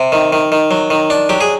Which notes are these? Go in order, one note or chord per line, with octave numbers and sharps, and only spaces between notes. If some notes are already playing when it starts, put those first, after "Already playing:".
Already playing: C3
D#3
D#3
D#3
F#3
D#3
D4
F#3 G4
G#4